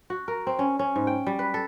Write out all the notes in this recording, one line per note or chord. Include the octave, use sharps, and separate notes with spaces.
F#4
A#4
C4
C#4
C#4
G#2
G5
G3
B4
A4